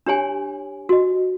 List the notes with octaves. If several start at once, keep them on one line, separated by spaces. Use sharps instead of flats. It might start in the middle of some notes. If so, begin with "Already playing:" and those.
D4 G4 C#5 G#5
F#4 D#5